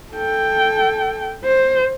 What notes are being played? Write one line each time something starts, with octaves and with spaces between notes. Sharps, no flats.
A4 G5
C5